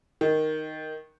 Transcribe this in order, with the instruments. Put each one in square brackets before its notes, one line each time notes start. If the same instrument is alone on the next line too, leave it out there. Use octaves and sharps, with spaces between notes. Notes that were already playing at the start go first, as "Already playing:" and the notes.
[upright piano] D#3